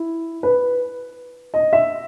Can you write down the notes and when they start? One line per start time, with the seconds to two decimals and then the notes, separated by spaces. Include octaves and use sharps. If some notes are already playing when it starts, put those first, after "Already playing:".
Already playing: E4
0.43 B4
1.54 D#5
1.73 E5